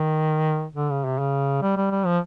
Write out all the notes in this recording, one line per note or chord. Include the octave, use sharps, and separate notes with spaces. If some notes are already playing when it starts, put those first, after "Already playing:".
Already playing: D#3
D3
C#3
C3
C#3
G3
G3
G3
F3